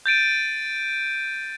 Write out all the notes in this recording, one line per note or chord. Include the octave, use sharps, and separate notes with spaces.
G6 A6 D7 D#7